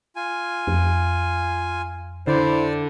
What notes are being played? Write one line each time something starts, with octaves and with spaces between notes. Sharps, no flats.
F4 G#5
F2
D3 E4 C5 D5